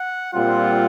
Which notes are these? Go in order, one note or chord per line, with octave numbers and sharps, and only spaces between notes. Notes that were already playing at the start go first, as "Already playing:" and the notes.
Already playing: F#5
A#2 G3 C4 F4 F#5